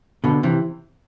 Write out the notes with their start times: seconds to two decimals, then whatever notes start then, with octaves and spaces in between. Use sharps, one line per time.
0.24 B2 D3
0.43 C3 E3